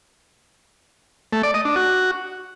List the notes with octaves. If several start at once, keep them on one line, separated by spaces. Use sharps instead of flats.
A3
D5
D#5
D4
F#4